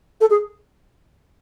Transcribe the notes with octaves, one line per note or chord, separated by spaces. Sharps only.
A4
G#4